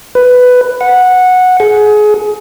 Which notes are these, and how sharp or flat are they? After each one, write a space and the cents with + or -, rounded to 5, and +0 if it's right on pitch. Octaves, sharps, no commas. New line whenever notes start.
B4 +10
F#5 -10
G#4 +25